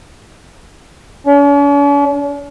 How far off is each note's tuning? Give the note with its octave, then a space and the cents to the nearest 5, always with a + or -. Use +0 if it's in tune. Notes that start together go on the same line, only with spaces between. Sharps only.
C#4 +45